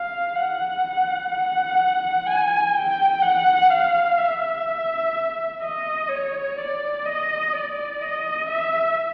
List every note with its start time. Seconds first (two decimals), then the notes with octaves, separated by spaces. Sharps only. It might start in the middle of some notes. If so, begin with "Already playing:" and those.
Already playing: F5
0.35 F#5
1.31 F#5
2.27 G#5
2.75 G5
3.22 F#5
3.70 F5
4.18 E5
5.62 D#5
6.09 C#5
6.57 D5
7.05 D#5
7.53 D5
8.01 D#5
8.49 E5